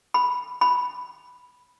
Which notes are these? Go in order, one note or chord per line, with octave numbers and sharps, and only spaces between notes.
B5
B5